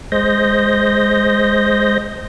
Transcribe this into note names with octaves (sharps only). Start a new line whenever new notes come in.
G#3 C5 D#5 G6 A#6